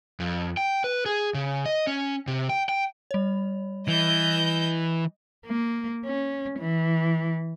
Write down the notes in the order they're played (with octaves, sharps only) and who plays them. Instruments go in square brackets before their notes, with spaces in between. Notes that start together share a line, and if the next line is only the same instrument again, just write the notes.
[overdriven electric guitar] F2
G5
B4
G#4
C#3
D#5
C#4
C3
G5
G5
[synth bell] G3 C#5
[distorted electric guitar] E3 [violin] D#5 G6
[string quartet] A#3
C#4
E3